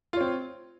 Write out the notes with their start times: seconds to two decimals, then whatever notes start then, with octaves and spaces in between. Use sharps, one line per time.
0.13 F4
0.17 C#5
0.21 C4